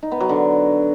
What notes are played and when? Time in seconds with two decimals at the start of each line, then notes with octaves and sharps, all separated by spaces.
0.03 D#4
0.11 B3
0.20 F#3
0.29 D3